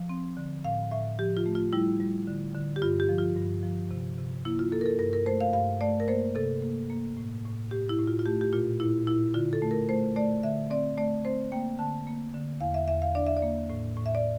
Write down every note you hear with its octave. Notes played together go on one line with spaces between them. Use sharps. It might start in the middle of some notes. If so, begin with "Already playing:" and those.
Already playing: F3
C4
D3
A2 F5
A2 E5
F3 G4
F4
A3
F4
G3 E4
G3
D3
D3
G4
G2 F4
G4
F3
F4
G2
F3
C3
C3
A#3 E4
F4
A#3 A4
A#4
A4
G2 A#4
A#4
A3 C5
F5
G2 F5
A3 D5
A#4
A#3 C5
C3 A4
A#3
A#3
A2
A2
A2 G4
E4
A2
F4
F4
A3 G4
G4
A#2 F4
A#2 E4
A#2 E4
D3 F4
A4
A3
A#4
A3 C5
A3 D5
D3 E5
C4 D5
A3 D5
C4 C5
A#3 G5
D3 A5
A#3
D3
E2 F5
E5
E2 E5
F5
D4 D5
E5
D5
A#3
A2
A2
E5
D5